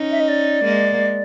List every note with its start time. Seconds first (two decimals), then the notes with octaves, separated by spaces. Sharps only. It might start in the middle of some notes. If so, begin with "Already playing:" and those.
Already playing: C#4 D#4
0.11 E5
0.20 D#5
0.28 D5
0.64 G#3 A#3